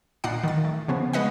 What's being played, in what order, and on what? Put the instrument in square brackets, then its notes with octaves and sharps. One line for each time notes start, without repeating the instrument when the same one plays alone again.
[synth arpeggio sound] A#2 D#4 D5 F#5 C7
D#3 A6
A3
C#3 F3 B3 C#4
G#3 B3 B4 D#5 F#5